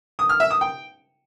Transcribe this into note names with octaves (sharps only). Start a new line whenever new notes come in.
D#6
F6
E5
D#6
G5